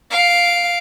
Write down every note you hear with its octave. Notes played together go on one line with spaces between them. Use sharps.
F5 D7